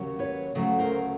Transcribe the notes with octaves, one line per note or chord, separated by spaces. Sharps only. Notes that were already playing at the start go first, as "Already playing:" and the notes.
Already playing: D#2 C#3 F#3
B4 C#5
D2 C#3 F#3 A3
A#4 C5